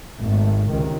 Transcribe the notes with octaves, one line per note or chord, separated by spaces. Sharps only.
G#1 A3
C#2 C3 D#3